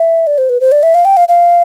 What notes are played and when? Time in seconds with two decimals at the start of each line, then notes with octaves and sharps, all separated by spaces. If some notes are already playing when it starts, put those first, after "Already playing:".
Already playing: E5
0.27 D5
0.38 C5
0.49 B4
0.61 C5
0.72 D5
0.83 E5
0.95 F5
1.05 G5
1.17 F5
1.28 F5